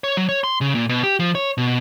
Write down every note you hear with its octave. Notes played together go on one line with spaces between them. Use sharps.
C#5
F#3
C#5
C6
C#3
A#2
B2
G4
F3
C#5
B2